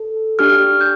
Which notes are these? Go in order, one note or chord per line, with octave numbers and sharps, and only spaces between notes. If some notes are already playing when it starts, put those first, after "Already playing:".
Already playing: A4
D4 G4 F6
G6